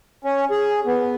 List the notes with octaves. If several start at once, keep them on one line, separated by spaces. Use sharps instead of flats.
C#4
G#4
B3